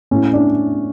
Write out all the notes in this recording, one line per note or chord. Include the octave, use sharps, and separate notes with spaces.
A2 C#4
D4